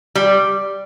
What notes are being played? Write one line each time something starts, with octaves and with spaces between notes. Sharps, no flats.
G3